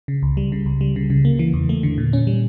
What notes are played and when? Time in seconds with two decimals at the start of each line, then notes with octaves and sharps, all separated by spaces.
0.08 C#3
0.23 C#2
0.37 G3
0.52 C#3
0.66 C#2
0.81 G3
0.96 C#3
1.10 C#3
1.25 A#3
1.39 E3
1.53 E2
1.69 A3
1.83 D3
1.98 A#2
2.13 C#4
2.27 G3